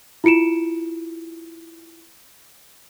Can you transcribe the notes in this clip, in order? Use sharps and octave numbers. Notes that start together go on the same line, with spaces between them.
E4 F4 C#7 D7 E7